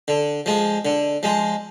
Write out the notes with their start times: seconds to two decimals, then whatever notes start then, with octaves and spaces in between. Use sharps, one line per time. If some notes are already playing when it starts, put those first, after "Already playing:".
0.08 D3
0.46 F3 G#3
0.85 D3
1.23 F3 G#3